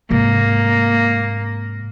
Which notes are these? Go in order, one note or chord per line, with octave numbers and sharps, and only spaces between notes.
G#2 C3 A#3